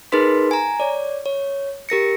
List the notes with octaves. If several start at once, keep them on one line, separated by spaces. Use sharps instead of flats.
D#4 G#4 A#4 B4 C6 B6
G#5 A#5
C#5 D5
C#5
G4 A#4 A#6 C#7